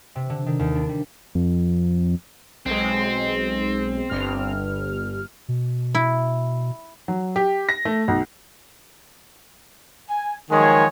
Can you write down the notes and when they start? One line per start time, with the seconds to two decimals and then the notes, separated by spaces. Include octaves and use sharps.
0.15 C3
0.30 D3
0.46 D#3
0.59 D#2
0.75 D4
0.89 G3
1.35 F2
2.66 B1 G#3 C4
4.10 G1 G2 F6
5.48 B2
5.95 E4
7.08 F#3
7.36 G4
7.69 A#6
7.85 A3
8.08 B1
10.10 G#5
10.51 D#3 F3 F#3 G#3 G#4 C#5